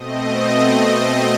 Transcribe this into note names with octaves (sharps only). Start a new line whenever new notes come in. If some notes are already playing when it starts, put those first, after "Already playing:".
Already playing: B2 A3 C4 D#5